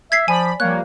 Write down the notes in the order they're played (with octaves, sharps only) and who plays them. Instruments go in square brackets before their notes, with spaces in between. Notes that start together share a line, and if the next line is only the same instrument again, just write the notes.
[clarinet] E5 [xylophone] G#6 B6 C7
[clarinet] F3 [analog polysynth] D5 B5 [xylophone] G#5
[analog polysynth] F3 G3 A#3 [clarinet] C#5 [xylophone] F#6